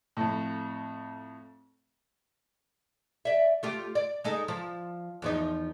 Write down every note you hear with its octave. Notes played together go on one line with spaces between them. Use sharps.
F2 A2
D5 E5
A3 F4 G4
D5
G#3 D#4 A4
F3
E2 F3 D#4